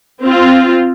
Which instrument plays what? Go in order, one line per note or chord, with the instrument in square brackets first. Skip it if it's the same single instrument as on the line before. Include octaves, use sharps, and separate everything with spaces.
[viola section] C4 F4